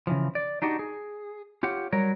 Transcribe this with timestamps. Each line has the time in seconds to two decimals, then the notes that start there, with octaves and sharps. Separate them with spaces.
0.07 C#3 E3 F3
0.35 D5
0.62 D4 D#4 F#4 G4
0.79 G#4
1.63 F4 G4 C#5 F#5
1.92 F#3 G3 A#4 C#5